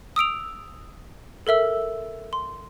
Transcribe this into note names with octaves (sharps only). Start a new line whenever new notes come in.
D#6 E6 D7 F7
A4 A#4 E5 E6
C6